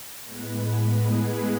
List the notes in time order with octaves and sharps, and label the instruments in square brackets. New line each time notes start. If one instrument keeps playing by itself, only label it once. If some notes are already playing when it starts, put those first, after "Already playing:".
[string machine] A2 G#3 B3 B4
G#4